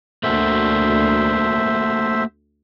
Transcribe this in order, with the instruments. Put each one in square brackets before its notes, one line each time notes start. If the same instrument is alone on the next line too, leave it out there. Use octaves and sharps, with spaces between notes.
[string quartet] D2 [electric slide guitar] A3 A#3 F#4 [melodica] C5 E5